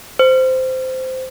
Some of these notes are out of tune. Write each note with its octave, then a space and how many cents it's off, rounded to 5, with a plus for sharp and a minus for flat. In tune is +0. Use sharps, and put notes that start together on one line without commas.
C5 -15